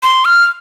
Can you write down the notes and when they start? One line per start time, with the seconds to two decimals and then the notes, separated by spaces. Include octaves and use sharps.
0.03 C6
0.25 F6